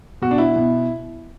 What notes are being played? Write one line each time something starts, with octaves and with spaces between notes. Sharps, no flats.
B2 F#4
D4
E4
B2